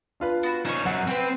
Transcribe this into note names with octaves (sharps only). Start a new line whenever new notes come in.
D4 F4 B4
B3 F#4
C#4 D#4 C5 C#6
F#2 F#5
C4 B4 G5